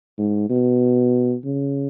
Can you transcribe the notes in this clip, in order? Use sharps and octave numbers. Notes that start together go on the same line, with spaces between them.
G#2
B2
C#3